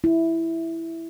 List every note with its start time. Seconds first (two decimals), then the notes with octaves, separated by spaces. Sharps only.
0.04 E4